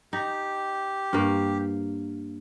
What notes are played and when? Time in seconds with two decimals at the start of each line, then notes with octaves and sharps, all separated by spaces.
0.13 D#4 G4
1.13 G2 A#3